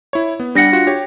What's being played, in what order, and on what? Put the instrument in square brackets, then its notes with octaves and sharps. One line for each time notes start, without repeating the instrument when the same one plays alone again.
[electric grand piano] E4 C#5
B3
[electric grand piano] G3 F#5 [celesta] D4 A#6 C#7
[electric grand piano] F4 F#4
G4 C#5